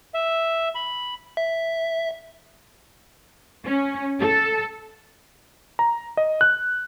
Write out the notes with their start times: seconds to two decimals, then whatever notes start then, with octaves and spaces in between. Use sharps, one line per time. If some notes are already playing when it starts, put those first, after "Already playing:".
0.14 E5
0.75 B5
1.37 E5
3.66 C#4
4.20 A4
5.79 A#5
6.17 D#5
6.41 F#6